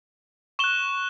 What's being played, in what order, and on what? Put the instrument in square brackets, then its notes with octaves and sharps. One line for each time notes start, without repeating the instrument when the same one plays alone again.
[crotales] C#6 F#6 E7 G7